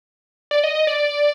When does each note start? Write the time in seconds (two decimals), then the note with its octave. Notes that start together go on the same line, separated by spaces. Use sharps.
0.51 D5
0.64 D#5
0.75 D#5
0.87 D5